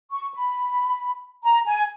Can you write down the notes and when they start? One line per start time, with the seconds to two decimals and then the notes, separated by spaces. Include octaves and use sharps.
0.12 C#6
0.34 B5
1.44 A#5
1.67 G#5